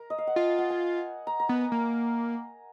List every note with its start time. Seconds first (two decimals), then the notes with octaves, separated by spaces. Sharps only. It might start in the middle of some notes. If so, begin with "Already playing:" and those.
Already playing: A#4
0.10 D#5
0.18 F5
0.27 F#5
0.36 F4 G#5
0.58 F#5
0.70 G#5
1.27 A#5
1.40 A#5
1.49 B3 G#5
1.72 A#3